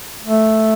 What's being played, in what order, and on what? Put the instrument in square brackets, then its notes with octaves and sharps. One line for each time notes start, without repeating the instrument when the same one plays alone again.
[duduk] A3